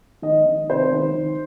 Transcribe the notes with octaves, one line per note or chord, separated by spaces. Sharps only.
D#3 D#5
D#3
C3 C5
D#3
D#3